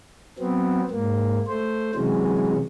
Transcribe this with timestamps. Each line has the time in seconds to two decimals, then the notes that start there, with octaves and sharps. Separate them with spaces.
0.39 F#3 B3 C4
0.91 G#2 A#3
1.48 A3 C5
1.95 C3 E3 F#3 G#3 C#4